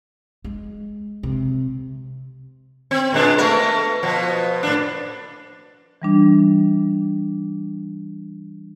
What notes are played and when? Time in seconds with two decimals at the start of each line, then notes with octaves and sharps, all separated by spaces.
0.44 G#3
1.23 C3
2.91 C4
3.13 A#2 G#3 D4
3.38 A3 B3 A#4
4.03 B2 F3
4.63 A2 D4
6.02 E3 G3 D4